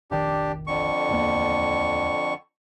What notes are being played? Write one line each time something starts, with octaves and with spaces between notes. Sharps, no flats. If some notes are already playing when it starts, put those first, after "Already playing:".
F1 A#1 D#3 D4 G4
F2 D3 C#6
D1 E2 A#3